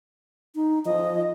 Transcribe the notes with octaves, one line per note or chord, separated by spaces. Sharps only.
D#4
F3 D#5